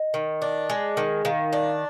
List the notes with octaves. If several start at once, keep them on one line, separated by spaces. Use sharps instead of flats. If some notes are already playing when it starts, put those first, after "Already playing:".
Already playing: D#5
D#3
D4
G#3
D#3
D#3 F5
D4